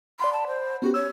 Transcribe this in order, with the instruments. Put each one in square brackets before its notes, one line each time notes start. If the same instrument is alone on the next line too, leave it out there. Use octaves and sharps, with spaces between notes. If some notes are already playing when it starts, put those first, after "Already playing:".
[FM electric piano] D5 F#5 B5 [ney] C6
[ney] A5
C5
[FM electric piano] B3 C#4 G4 [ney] F#4
[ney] C#5 [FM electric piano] E6